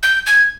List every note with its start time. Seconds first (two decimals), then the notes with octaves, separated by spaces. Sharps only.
0.03 G6
0.26 G#6